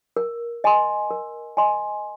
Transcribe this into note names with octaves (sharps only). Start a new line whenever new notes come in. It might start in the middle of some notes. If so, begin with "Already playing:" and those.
A#4
D#5 G#5 C6
A#4
D#5 G#5 C6